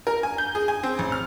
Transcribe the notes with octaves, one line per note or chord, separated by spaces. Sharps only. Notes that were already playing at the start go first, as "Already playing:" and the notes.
A#4
G#5
G6
G#4
G#5
C4
A1
F6